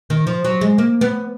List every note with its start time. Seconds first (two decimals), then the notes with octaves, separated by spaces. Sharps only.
0.10 D#3
0.27 F3
0.45 F#3
0.61 G#3
0.78 A#3
1.01 B3